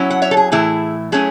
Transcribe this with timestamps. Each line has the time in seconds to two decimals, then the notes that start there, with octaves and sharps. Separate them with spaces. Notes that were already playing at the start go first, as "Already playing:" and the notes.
Already playing: F#3 C#4 E4
0.10 F#5
0.22 C#5 E5
0.31 A4
0.37 G#4
0.52 A2 E3 A3 E4 G#4
1.12 F#3 A3 C#4 E4 G#4